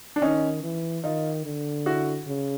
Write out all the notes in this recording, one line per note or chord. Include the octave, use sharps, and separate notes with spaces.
D4
D#3 C#4 D#4
E3
D#3 D#4 F4
D3
E4 F#4
C#3